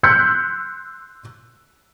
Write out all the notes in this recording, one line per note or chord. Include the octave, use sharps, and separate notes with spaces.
C6 E6 F#6 G6 B6 C#7